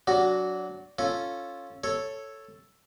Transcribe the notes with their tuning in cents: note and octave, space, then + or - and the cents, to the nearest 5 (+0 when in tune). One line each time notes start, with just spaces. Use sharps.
F#3 +0 D4 -20 F#4 +0
C#4 +0 F4 +0 A4 +0
A4 +0 C#5 -5